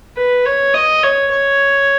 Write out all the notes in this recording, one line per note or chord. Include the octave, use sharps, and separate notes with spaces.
B4
C#5
D#5
C#5
C#5